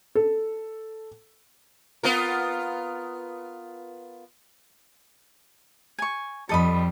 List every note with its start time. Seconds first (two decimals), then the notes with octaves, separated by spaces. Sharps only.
0.15 A4
2.03 B3 F4 A#4
5.98 G#5 C#6
6.49 F2 G3 A4 D#5 B5